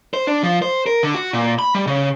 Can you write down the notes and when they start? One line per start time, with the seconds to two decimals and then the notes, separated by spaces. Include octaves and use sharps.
0.14 C5
0.27 D4
0.43 F3
0.62 C5
0.87 A#4
1.03 D3
1.15 F#4
1.33 A#2
1.59 B5
1.75 G3
1.87 C#3